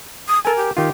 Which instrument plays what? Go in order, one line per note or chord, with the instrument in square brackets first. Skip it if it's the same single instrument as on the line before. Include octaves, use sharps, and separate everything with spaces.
[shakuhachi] D#6
[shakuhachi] A4 [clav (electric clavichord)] A#4 G#5
[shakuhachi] G4
[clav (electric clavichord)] D#3 F4 [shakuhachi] G4